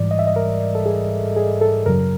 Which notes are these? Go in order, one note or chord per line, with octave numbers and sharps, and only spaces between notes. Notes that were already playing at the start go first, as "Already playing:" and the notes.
Already playing: G#2 E3 G3 D5
D#5
E5
D#5
A#4
A4
G#4
G#4
A4
F#2 C#3 F#3 A#4